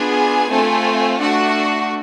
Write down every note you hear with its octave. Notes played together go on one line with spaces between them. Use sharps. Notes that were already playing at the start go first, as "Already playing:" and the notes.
Already playing: B3 D4 F4 G#4
G#5
A3 C4 F4 A4
A3 D4 F#4 F#5